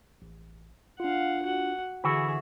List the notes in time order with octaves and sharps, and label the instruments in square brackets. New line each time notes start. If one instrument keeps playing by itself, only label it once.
[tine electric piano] A1
[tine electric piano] D4 F4 [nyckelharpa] F5 F#5
[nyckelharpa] F#4 F#5
[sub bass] D3 [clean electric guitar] E3 F#4 [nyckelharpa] G#4 E5 [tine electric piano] B5 E6